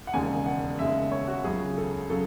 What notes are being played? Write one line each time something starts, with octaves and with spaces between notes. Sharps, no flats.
F#5
E1 D#2 C#3 G#3 G#5
F#5
E1 D#2 C#3 G#3 E5
C#5
F#4
C#2 C#3 F#3 G#4
A4
C#3 F#3 A4